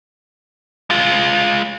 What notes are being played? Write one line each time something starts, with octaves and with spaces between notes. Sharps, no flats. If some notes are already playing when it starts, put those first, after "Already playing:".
G#3 F4